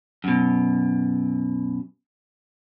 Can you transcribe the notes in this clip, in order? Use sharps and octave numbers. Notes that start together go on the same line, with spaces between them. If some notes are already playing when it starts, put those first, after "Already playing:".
F#2 B2